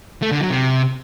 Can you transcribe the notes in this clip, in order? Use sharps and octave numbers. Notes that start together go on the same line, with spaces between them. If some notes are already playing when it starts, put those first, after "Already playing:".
A3
D3
F#3
C3